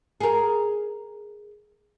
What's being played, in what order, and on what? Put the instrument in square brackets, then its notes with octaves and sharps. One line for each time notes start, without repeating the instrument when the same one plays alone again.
[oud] G#4 A#4